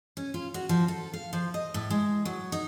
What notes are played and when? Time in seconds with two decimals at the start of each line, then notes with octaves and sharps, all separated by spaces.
0.17 C#4
0.34 F4
0.54 F#4
0.69 F3
0.88 A4
1.13 F5
1.33 F3
1.54 D#5
1.74 A2
1.90 G#3
2.25 F#3
2.52 D#4